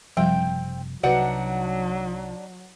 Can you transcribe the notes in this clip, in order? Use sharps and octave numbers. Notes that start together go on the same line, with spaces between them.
F#1 C3 F3 G3 C4 G5
C2 C3 F#3 D4 D#4 F#4 B4 F#5